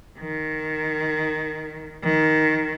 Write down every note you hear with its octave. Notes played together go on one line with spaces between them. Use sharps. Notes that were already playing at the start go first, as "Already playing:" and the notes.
D#3
D#3